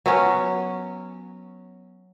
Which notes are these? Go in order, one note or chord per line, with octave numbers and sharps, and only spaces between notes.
F#3 B3 C#4